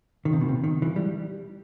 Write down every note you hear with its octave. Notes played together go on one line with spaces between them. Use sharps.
D#3
C3
B2
C3
D#3
E3
G3